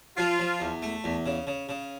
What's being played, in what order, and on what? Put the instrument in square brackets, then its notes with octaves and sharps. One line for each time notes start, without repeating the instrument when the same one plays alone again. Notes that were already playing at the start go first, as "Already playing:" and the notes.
[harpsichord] F3 [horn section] F4
[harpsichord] F3
E2
A3
E2
C#3
C#3
C#3